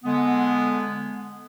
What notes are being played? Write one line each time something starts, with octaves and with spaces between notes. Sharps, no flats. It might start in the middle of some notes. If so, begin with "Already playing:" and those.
D3 G#3 B3